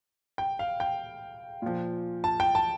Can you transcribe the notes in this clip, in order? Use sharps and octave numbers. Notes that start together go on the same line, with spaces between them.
G5
F5
G5
A#2 F3
A5
G5
A5